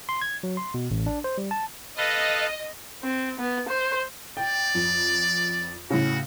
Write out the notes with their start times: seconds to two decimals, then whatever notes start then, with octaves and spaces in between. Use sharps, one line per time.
0.09 C6
0.21 G#6
0.43 F#3
0.57 C6
0.74 B2
0.91 A1
1.06 D4
1.24 C5
1.38 G3
1.51 A5
1.98 A4 B4 D#5 F5
3.03 C4
3.40 B3
3.69 C5
4.37 D5 G5
4.75 F2
5.90 A2 C#3 F#4